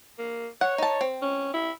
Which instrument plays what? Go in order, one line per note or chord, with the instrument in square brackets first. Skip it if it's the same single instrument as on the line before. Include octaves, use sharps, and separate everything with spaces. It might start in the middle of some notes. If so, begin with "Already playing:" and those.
[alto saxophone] A#3
[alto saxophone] C#5 [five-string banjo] F#5
[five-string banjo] D#4 A5
C4
[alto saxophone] C#4
E4